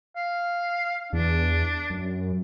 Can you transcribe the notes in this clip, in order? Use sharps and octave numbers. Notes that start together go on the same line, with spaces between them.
F5
E2 D4
F#2